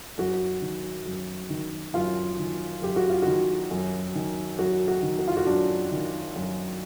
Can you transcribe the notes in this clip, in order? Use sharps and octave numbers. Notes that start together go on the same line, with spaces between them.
F#2 F#4
D#3
F#2
D#3
F#2 F4
D#3
F#2 G4
F#4
F4
D#3 F#4
F#2
D#3
F#2 F#4
F#4
D#3
F#4
F4
F#4
F#2 D4
D#3
F#2